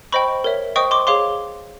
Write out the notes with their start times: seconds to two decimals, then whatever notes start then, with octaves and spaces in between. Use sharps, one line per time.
0.12 C5 D#5 G5 B5 C#6
0.44 A#4 C#5 E5
0.76 C5 D#5 G5 C#6 D#6
0.91 C6 D6
1.07 G#4 C#5 F5 C6 D6